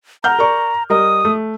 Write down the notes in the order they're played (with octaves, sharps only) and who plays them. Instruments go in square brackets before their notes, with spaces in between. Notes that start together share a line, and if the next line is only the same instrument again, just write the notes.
[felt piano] F#5 F6 G6 [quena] A#5
[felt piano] A#4 D5 C#6
[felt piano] G3 A#4 D#5 [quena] D#6
[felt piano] A3